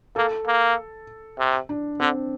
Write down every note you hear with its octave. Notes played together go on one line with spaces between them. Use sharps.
A#3 A4
A#3
C3
D4
D3 C4